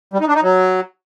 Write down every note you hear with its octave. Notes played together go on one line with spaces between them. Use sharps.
G3
D#4
D4
D#4
F#3